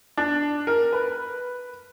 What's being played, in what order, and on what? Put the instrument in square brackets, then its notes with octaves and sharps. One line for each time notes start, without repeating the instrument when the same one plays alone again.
[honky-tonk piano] D4
A#4
B4